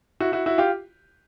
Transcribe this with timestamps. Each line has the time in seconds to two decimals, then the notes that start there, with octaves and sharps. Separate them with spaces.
0.20 E4 F#4
0.32 E4 F#4
0.46 E4 F#4
0.58 F4 G4